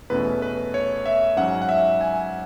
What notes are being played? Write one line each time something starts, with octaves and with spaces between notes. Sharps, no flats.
E2 B2 A3 C#4 B4
B4
C#5
E5
G#2 F#3 C#4 F#5
F#5
E5
G#5